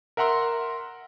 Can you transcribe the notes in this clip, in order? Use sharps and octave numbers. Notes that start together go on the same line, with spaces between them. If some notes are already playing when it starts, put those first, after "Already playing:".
A#4 E5 F#5 A#5 C6 E6